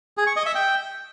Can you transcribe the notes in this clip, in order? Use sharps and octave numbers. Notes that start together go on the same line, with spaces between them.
G#4
C#6
D#5
E5
G5